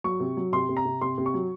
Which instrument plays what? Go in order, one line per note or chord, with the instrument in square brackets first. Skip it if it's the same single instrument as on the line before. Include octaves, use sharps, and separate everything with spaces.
[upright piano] F#3 C#6
C3
F#3
C3 C6
C3
A#5
C3
C3 C6
C3
C#6
F#3